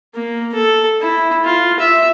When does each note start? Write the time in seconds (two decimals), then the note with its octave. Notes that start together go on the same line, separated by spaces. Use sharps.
0.15 A#3
0.54 A4
1.01 E4
1.44 F4
1.79 E5